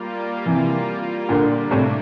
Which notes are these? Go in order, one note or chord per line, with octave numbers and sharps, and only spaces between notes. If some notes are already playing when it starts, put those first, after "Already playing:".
Already playing: G3 A#3 F4
C3 E3
A#2 D3 G3 A#3 D4
A2 C3